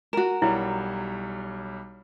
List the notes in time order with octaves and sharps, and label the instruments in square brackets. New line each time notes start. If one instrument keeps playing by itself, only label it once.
[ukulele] F#4 A#4 [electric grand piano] E7
[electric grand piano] B1 G3 C#5 [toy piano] E4